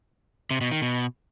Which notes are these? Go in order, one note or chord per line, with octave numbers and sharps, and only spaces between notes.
C3
B2
D#3
B2